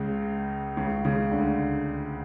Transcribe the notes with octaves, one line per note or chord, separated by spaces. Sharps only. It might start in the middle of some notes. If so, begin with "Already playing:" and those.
Already playing: C#2 C#3
C#2 C#3
C#2 C#3
D2 D3